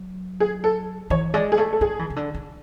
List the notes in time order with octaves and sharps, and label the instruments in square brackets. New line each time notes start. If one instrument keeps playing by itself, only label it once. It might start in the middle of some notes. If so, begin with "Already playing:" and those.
Already playing: [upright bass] F#3
[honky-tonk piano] G#4
A4
[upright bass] E3 [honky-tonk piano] C#5
[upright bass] G#3 [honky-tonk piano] D5
[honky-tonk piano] G#4
[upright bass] A3 [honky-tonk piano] A4
[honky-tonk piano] A4
[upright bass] G#3 [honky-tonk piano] G#4
[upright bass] E3
C#3
D3
D3